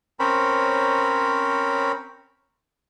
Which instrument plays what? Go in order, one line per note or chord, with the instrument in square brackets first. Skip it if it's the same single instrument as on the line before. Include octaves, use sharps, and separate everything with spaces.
[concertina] C4 C#4 A#4 C5 C#5 B5